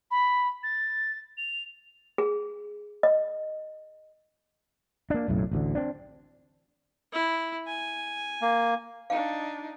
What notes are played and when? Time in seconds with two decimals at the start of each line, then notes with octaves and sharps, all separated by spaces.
0.11 B5
0.63 A6
1.37 F7
2.18 G#4
3.03 D#5
5.10 A#3 D4
5.28 B1 F#2 A2
5.51 A1 D2 D3
5.75 C4 D4
7.13 E4
7.67 G#5
8.41 A#3
9.10 D4 D#4 F5 G5